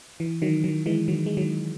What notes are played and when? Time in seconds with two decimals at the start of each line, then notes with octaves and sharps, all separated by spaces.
0.20 E3
0.42 D#3 F#3
0.64 D#3 F#3
0.86 E3 G#3
1.08 D#3 F#3
1.26 G#3
1.37 D#3 F#3